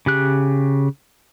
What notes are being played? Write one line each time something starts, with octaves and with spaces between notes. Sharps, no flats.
C#3 G4 F#6